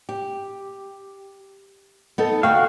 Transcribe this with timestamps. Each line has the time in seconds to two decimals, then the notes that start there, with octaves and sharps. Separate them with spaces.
0.09 G4
2.18 B3 D#4 A4
2.43 D2 F#4 F5 G5